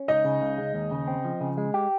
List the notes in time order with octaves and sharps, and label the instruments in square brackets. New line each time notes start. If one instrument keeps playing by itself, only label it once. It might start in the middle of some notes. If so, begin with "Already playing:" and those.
Already playing: [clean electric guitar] C#4
[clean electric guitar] C#2 [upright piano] D#4 D#5
[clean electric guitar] C#3
C#2
G#3
D#2
C#3
C4
F3
C#3
G#3
G4